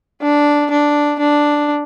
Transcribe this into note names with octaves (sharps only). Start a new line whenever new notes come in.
D4
D4
D4